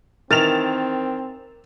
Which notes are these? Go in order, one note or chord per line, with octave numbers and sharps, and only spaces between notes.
D#3 E3 C4 A#4 A6 E7 F7